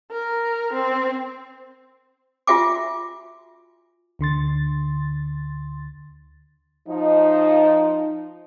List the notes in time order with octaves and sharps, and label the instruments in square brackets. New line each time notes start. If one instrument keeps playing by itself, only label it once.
[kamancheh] A#4
C4
[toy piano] F4 F#4 E5 G#5 D6
[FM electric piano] D2 D3 C6 A6
[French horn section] F3 D#4